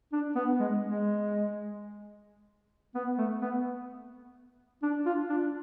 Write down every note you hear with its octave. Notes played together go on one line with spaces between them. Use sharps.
D4
B3
G#3
G#3
B3
A3
B3
D4
F4
D4